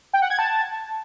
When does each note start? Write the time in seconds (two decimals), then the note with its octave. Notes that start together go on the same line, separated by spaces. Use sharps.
0.13 G5
0.22 F#5
0.30 G#6
0.39 A5